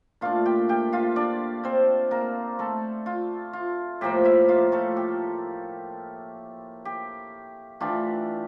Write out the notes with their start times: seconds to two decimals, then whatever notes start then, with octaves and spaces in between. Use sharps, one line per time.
0.21 A#2 A3 D4 F4 F5
0.45 G4 G5
0.69 G4 G5
0.92 F4 F5
1.16 D4 D5
1.64 C4 C5
2.11 A#3 A#4
2.59 A3 A4
3.06 F4
3.53 F4
4.01 A2 F3 A#3 G4
4.25 E4 E5
4.49 F4 F5
4.72 A3 A4
4.97 G4
6.85 G4
7.80 E3 A3 D4 F4 G4